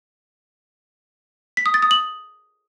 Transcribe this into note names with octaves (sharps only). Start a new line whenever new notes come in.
B6
D#6
A6
D#6
F#7